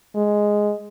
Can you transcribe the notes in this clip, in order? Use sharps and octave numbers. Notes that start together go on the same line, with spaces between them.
G#3